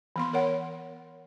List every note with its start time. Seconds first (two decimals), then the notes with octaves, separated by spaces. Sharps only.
0.16 E3 B3 C6
0.33 A#4 C#5 F#5